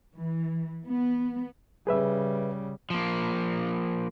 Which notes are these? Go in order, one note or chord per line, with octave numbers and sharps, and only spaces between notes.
E3
B3
C#3 G3 G#4 B4 E5
F3 A#3